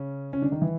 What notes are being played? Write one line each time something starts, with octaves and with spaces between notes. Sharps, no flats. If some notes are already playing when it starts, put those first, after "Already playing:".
Already playing: C#3 C#4
C#3 C#4
D3 D4
D#3 D#4
E3 E4